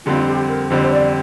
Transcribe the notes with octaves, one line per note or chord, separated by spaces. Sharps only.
F2 D3 G3 C4 F4
G4
A#4
F2 D3 G3 C4 C5
C5
D5